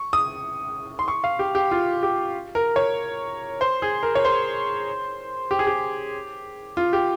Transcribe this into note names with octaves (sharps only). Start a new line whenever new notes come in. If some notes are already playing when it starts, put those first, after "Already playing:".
Already playing: C#6
D#6
C6
C#6
F5
G4
G4
F4
G4
A#4
C#5
C5
G#4
A#4
C#5
C5
G4
G#4
G4
F4
G4